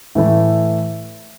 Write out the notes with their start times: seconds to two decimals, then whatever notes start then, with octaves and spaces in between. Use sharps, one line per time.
0.15 A2 E3 A3 E4